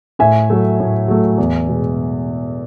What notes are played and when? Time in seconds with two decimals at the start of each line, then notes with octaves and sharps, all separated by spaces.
0.19 A2 E5 G#5
0.50 F#3 A3
0.80 A2
1.08 F#3 A3
1.38 E2
1.68 B2 G#3